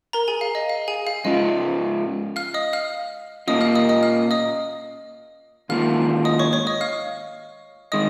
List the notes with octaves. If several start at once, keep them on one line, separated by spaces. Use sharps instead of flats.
A#4 A#5
G#4 G#5
F5
D#5
F5
G#4 G#5
F5
G#2 G#3 C#4 F4 D#5
F5 F6
D#5 D#6
F5 F6
A#2 A#3 C#4 F4 D#5 D#6
F5 F6
D#5 D#6
D#5 D#6
F5 F6
D#5 D#6
G#2 D#3 A#3 F4 F5 F6
D#5 D#6
C#5 C#6
C#5 C#6
D#5 D#6
F5 F6
D#3 G#3 D#5 D#6